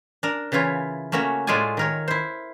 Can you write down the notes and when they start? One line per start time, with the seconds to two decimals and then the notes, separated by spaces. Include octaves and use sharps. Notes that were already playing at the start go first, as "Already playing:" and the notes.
0.23 D4 A#4
0.52 C#3 E3 E4 F4 C#5
1.12 A3 A#3 C#4 F#4 C#5
1.47 A2 G#3 A3 F4 D5 G#5
1.77 D#3 A#4 C#5
2.08 E4 C5